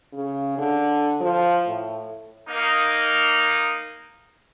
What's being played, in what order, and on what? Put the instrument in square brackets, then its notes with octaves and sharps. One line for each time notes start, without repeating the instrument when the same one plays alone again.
[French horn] C#3
D3
F3
A2
[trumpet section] A#3 D#4